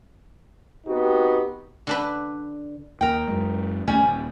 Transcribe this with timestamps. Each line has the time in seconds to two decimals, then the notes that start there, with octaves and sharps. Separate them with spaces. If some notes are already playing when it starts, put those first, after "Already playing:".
0.86 B3 C4 D#4 F#4 G4
1.87 D3 D4 B4
3.01 D#2 A#4 G5
3.28 F#2 G#3
3.88 D#2 D3 G3 A3 C#4 G#5
4.04 D#1